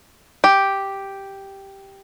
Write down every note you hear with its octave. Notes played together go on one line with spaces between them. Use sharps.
G4